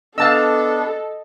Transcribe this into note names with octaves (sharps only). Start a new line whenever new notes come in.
B3 D4 A4 D#5 F5 A5 E6